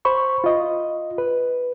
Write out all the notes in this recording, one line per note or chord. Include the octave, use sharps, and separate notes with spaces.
C5 B5 C#6
F4 D#5
B4